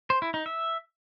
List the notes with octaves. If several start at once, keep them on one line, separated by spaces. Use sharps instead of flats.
C5
E4
D#4
E5